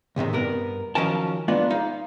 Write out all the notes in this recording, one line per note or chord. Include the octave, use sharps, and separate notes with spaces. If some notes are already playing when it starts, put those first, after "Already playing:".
C#2 A2 C3 D#3
G2 B3 A#4
D#3 F3 F#3 C#4 A#4 A5
G#3 A#3 B3 D4 F4
D#4 F5